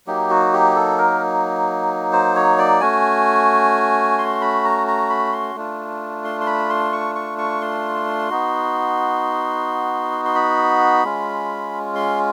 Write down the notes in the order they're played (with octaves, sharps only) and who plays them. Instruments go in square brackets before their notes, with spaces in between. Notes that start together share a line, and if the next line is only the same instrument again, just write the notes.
[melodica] F#3 A#3 D#4 G4
F#4
G4
A4
A#4
C5
C#5
D5
A3 C#4 F#4 G#5
C6
B5
A#5
A#5
B5
C6
A3 D4 F4
C6
C6
B5
C6
C#6
C#6
C#6
C6
B3 D#4 F#4
C6
B5
G#3 C#4 F4
C6